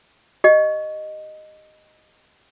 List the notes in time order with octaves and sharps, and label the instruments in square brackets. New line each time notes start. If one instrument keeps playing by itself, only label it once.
[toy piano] G4 D#5